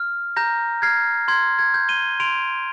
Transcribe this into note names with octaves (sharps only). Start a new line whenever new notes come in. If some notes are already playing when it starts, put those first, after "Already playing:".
Already playing: F6
A#5 G6 A#6
F6 G#6 C7
C6 G#6
G#6
G6
D#7 G7
C6 D7 F7